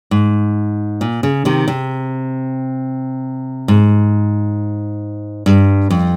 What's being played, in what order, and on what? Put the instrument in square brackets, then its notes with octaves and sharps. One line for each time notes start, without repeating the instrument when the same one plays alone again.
[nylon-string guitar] G#2
A#2
C#3
C3 D#3
C3
G#2
G2
F2